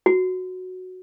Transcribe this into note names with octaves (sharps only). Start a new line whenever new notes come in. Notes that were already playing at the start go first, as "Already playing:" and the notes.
F#4